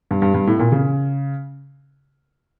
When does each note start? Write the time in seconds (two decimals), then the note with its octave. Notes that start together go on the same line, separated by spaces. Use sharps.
0.11 G2
0.22 G2
0.34 G2
0.47 A2
0.59 A#2
0.72 C#3